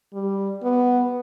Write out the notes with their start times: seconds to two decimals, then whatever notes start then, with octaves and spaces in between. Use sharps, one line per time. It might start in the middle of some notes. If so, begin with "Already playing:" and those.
0.13 G3
0.63 B3